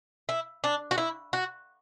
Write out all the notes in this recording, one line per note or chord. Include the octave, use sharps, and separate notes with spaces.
E4
D4
F#4
E4
F#4